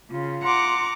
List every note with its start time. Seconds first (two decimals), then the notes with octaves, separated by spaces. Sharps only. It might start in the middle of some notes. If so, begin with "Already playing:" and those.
0.11 C#3 F4
0.44 F#5 A#5 C6 D6